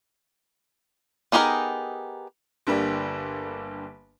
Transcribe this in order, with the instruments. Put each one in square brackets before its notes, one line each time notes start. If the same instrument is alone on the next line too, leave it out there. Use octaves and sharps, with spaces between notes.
[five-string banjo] B3 D#4 G4 G#4 A#4
[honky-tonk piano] G1 D3 G3 A#3